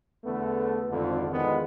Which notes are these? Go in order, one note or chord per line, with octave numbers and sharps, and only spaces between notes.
E2 D3 A3 B3
G#1 F2 D3
E2 D3 D#3 F3 G#3 B3